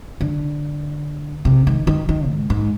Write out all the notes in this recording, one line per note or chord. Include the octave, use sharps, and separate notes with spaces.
D3
C3
D#3
D#3
D#3
G#2
G#2